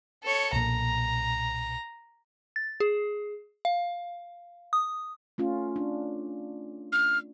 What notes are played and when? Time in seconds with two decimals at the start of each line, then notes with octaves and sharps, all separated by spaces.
0.23 A4 C#5
0.53 B1 A#2 A#5
2.56 A6
2.80 G#4
3.65 F5
4.73 D#6
5.38 A3 C#4 F4
5.76 D4
6.92 F6